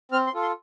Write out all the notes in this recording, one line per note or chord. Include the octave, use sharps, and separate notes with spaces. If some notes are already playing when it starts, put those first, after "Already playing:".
C4 F6
C6
F4 A4
C6